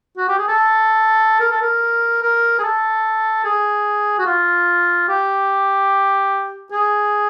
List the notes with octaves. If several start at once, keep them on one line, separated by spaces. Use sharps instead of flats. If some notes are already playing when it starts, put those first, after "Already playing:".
F#4
G4
G#4
A4
A#4
A4
A#4
A#4
G#4
A4
G#4
F#4
F4
G4
G#4